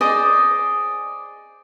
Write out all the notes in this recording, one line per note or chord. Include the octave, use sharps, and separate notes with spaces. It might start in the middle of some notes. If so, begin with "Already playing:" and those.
G#4 C5 D5 D#5